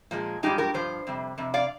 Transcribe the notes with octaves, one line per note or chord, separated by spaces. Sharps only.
A#2 F3 G#3
G2 F3 G#3 D#4 G4
G4 A#4
G2 F3 C5
F2 C3 G3
F2 C3
D5 F5